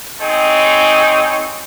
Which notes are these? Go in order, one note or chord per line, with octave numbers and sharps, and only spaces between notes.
C4 D#4 G#4 C#5